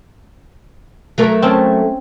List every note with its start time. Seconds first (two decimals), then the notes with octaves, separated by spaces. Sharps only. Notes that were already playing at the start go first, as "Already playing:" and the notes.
1.18 F#3 A3 A#4
1.42 C4 C#4 A5